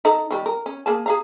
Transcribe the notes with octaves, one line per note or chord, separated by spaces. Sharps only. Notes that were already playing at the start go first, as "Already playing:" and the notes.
D#4 A4 A#5
D#3 G3
A#4
C#4
A#3 G#4 A5
G#4 F5 A#5